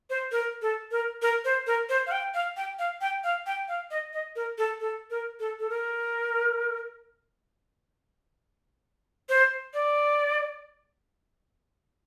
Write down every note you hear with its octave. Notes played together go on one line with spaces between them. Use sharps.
C5
A#4
A4
A#4
A#4
C5
A#4
C5
F5
G5
F5
G5
F5
G5
F5
G5
F5
D#5
D#5
A#4
A4
A4
A#4
A4
A4
A#4
C5
D5